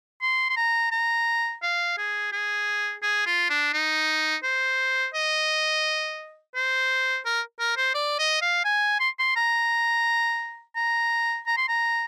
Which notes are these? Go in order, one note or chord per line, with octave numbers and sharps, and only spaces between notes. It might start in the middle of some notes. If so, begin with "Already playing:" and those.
C6
C6
A#5
A#5
F5
G#4
G#4
G#4
F4
D4
D#4
C5
D#5
C5
A#4
A#4
C5
D5
D#5
F5
G#5
C6
C6
A#5
A#5
A#5
C6
A#5